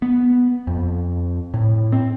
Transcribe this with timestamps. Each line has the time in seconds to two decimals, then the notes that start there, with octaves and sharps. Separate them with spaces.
0.02 B3
0.67 F2
1.54 A2
1.92 C4